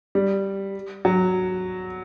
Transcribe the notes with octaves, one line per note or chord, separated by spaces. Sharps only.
G3
F#3